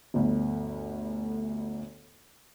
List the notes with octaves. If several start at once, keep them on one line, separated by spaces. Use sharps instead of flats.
G1 D2